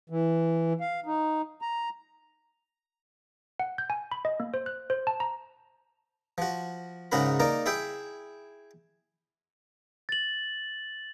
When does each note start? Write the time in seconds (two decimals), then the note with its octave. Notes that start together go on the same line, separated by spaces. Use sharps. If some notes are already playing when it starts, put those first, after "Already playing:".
0.10 E3
0.80 F5
1.06 D#4
1.62 A#5
3.60 F#5
3.78 G6
3.90 G#5
4.12 B5
4.25 D#5
4.40 A#3
4.54 C5
4.66 F#6
4.90 C5
5.07 A5
5.20 A#5
6.38 F3 F#4
7.12 G#2 C#3 D#4 F#4 A#4 B5
7.40 A#3 D#4 A#4 D5
7.66 E4 G#4 E5 G5
10.09 A6 F#7